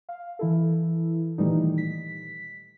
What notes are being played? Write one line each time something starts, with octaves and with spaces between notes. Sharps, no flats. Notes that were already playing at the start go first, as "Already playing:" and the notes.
F5
E3 E4 A4
A#2 D#3 E3 G3 A3 D#4
B6